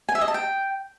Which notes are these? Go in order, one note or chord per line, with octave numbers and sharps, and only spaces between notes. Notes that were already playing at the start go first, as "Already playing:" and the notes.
G#5
E5
D#5
A5
G5